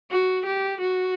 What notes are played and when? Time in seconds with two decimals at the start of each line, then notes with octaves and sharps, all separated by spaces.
0.11 F#4
0.46 G4
0.81 F#4